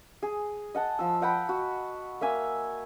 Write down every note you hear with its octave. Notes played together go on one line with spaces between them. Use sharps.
G#4
D#5 F#5 A5
F3 E6
D#5 F#5 G5 B5
F#4
A#3 E5 G#5 E6